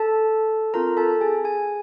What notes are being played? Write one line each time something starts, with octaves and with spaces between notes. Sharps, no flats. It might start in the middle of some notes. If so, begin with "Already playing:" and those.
Already playing: A4 A5
C4 F4 A4 A#4 A#5
A4 A5
G#4 G#5
G#4 G#5